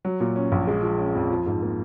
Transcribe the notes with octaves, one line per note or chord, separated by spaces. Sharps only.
F#3
A#2
C#4
A#1
G#3
F3
C#4
F2
F3
G#2
A#3